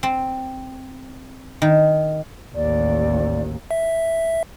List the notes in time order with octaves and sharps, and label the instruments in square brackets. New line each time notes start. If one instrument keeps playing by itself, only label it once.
[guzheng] C4
D#3
[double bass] A1 D#2 [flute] D5
[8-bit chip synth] E5